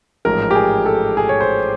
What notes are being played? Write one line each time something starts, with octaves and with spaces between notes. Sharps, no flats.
A1 G#2 F3 G#3 A#4
G4
G#4
A4
G#4
C#5
C5